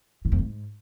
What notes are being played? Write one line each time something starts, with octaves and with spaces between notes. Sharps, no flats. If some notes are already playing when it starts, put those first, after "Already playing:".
A2
F2
G#2